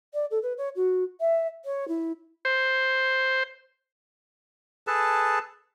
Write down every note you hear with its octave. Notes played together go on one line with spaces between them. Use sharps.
D5
A4
B4
C#5
F#4
E5
C#5
E4
C5
G#4 A4 B4 A5